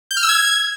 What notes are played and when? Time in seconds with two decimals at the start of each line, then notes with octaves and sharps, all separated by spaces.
0.11 G6
0.17 F6
0.23 E6
0.29 G#6